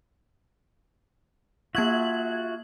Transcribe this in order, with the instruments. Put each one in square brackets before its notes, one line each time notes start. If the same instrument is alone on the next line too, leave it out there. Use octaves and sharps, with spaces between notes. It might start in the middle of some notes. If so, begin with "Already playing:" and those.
[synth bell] A#3 G#6 F#7 [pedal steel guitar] F4 F#4 E5